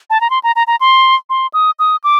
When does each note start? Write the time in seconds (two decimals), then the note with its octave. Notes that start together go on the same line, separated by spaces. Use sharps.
0.10 A5
0.21 A#5
0.30 C6
0.43 A#5
0.56 A#5
0.67 A#5
0.81 C6
1.30 C6
1.54 D#6
1.79 D#6
2.04 D6